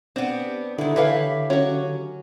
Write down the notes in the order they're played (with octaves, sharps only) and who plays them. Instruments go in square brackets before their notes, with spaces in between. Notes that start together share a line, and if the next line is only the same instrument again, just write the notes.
[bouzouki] B3 G4 [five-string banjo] C4 [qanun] D4
[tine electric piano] D3 [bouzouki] D#3 G#3 [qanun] E4
[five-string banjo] E3 B4 [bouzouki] G4 E5 F5 [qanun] C#5
[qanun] F#3 C#6 [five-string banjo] C#4